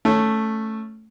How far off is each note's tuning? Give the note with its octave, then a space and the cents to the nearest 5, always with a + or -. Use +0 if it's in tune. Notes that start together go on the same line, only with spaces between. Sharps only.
A3 +0 C#4 +0